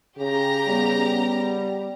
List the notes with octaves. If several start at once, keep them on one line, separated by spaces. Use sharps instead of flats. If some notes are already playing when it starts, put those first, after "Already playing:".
C#3 G4 A#5
G3 B3